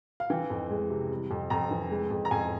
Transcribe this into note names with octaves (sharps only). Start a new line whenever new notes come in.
F5
E3 G5
F2
G#3
C3
G3
F2
F2 A#5
E3
G#3
F2
A#5
F2 G#5